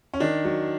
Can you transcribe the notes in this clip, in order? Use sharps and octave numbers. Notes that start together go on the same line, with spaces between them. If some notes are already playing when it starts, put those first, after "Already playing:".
C#4
D#3 D4
F#3